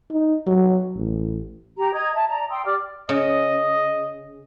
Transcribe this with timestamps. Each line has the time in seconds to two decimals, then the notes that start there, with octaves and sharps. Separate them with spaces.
0.11 D#4
0.47 F#3
0.96 A1
1.77 G4 A#5
1.93 D#5 A#5 D#6 G#6
2.14 E5 A5
2.28 D5 A#5
2.51 G5 C6 D#6 E6
2.65 G4 D5 D6 F6
3.09 C#3 D#5